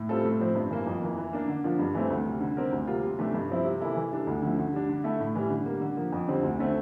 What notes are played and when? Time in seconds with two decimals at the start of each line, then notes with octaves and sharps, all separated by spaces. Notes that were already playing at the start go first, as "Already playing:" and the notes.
Already playing: A2
0.09 G3 C4 F4 A4
0.25 A2
0.40 F3 C4
0.55 G2
0.71 E3 A#3
0.87 F2
1.02 E3 A#3
1.18 E3
1.33 A#3 D4
1.48 D3
1.64 F3 A#3 D4 F4
1.79 G2
1.95 E3 A3 C4
2.10 D2
2.25 C3 G3
2.40 D3
2.57 G3 C4 G4 A#4
2.72 D2
2.87 C3 G3 A#3 F4
3.03 C3
3.19 E3 A3 D4 G4
3.34 G2
3.50 F3 C4 E4
3.65 C3
3.81 E3 A#3 E4 A4
3.96 E3
4.11 G3 D4 A4
4.27 D2
4.42 D3 F3 A3
4.58 D3
4.73 G3 D4
4.89 D3
5.04 A3 E4 A4
5.20 A2
5.35 E3 G3
5.50 D3
5.66 G3 A#3
5.81 D3
5.97 F3 A#3
6.12 F2
6.28 D3 G3 C4
6.43 D2
6.59 D3 A3 C4